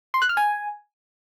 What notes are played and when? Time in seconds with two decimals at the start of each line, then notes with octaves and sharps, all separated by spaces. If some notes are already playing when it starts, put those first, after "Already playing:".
0.14 C6
0.22 F#6
0.29 F6
0.37 G#5